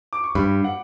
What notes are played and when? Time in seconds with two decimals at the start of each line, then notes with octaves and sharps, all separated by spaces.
0.13 D6
0.24 C#6
0.35 G2 B5
0.64 F#5